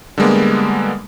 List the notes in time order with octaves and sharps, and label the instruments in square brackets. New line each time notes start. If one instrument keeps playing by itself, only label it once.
[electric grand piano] D3 G3 G#3 A#3 B3